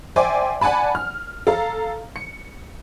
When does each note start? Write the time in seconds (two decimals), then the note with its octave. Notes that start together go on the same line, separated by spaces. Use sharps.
0.16 C5 D5 E5 G5 G#5 D6
0.61 D5 F#5 G#5 A5 B5
0.95 F6
1.47 A4 F5 A#5
2.16 C#7